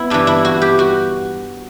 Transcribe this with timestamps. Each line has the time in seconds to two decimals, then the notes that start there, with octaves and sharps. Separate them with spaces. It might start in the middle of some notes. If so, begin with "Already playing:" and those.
Already playing: B3 E4
0.10 G2 E3 D4
0.27 E4
0.45 F#4
0.62 G4
0.79 F#4